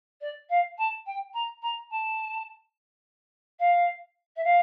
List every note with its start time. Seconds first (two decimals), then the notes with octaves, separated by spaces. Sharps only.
0.21 D5
0.49 F5
0.78 A5
1.06 G5
1.33 A#5
1.62 A#5
1.90 A5
3.59 F5
4.36 E5
4.44 F5